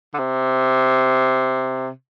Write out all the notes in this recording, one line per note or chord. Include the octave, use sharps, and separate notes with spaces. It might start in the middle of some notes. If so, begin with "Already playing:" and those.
D3
C3